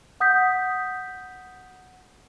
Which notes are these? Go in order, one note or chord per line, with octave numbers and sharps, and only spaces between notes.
F#5 D#6 G6 B6